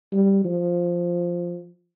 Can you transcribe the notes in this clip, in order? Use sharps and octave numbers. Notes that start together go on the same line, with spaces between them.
G3
F3